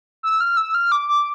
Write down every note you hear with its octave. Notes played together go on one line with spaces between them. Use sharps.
E6
F6
E6
F6
D6
D6